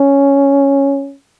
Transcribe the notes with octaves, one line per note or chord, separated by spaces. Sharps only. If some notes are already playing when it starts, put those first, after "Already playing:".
Already playing: C#4